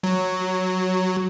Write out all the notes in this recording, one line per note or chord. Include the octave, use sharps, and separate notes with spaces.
F#3